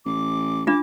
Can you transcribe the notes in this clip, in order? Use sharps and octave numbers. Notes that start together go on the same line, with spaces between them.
A1 D6
D4 F4 D6